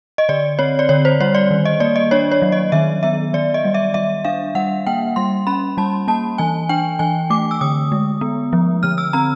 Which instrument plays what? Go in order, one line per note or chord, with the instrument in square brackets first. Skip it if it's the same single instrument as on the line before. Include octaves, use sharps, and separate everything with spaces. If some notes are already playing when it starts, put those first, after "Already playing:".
[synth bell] D#5
D3 D5
C4 C#5
D5
D3 C#5
C5
G3 C#5
D5
D#3
D#5
A#3 D5
D#5
D4 C#5
C#5
F#3
D#5
D#3 E5
B3 E5
D#3 D5
D#5
G3
E5
G3 E5
D4 F5
G3 F#5
A#3 G5
G3 C6
C#4 B5
G3 A5
A#3 A5
E3 G#5
D4 G5
E3 G#5
A3 D6
E6
D3 D#6
G#3
B3
F3
D3 F6
E6
C4 A#5